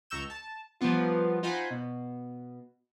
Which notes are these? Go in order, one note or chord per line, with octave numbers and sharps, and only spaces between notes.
C#2 A#5 C#6 E6 G6 E7
A5
F3 G3 A#3 B3 F4
D#4 F4 C5 F#5 G#5 B5
B2